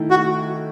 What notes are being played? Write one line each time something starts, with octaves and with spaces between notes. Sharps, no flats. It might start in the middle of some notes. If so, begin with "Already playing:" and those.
Already playing: D#3 A3 E4
F#4